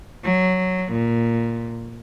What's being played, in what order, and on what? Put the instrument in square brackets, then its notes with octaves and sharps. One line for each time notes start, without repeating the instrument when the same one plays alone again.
[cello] F#3
A#2